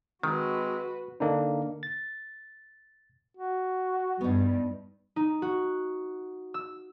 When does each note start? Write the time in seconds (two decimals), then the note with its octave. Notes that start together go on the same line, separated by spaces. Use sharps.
0.23 D#3 G#3 C4 F#4 B4
1.20 D3 A#3 D4 D#4
1.83 A6
3.37 F#4
4.21 G2 B3 D#4
5.16 D#4
5.42 F#4
6.54 E6